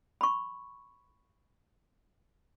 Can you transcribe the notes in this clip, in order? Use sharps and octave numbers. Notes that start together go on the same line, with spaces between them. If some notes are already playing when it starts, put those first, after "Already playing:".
B5 C#6